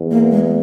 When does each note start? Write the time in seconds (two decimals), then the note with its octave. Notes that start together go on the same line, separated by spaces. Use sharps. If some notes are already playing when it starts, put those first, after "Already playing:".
Already playing: E2
0.11 A#3
0.31 G#3